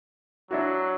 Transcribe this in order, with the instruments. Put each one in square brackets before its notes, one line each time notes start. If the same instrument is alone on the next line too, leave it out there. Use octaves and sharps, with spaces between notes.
[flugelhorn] F#3 [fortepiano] D4 E4 F#4